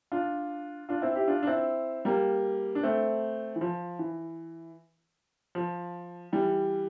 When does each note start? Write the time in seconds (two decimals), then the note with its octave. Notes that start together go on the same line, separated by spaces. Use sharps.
0.12 D4 F4
0.89 D4 F4
1.02 C4 E4
1.15 E4 G4
1.28 D4 F4
1.43 D4
1.47 C4 E4
2.05 G3 A#3
2.75 D4
2.83 A3 C4
3.56 E3
3.61 F3
3.99 E3
5.55 F3
6.32 E3 G3